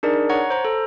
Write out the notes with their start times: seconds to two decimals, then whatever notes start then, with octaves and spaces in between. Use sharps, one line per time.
0.03 D4 D#4 G#4 A#4 D5
0.29 C#5 F#5 A#5 C#6
0.50 C5 A#5
0.65 A4